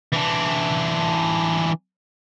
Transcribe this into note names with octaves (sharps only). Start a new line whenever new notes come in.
E3 D4